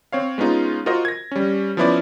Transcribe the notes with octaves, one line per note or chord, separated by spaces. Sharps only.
C4 C#5 F5
G#3 B3 C#4 D#4 F4
F4 F#4 A#4 C5 D#5
G#6 A#6
G3 C#4
F3 B3 C#4 E4 B4 D5